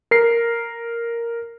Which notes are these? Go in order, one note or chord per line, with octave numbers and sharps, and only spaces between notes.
A#4 C7